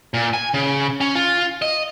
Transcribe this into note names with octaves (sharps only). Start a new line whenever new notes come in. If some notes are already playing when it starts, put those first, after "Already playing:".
A#2
G#5
C#3
C#4
F4
D#5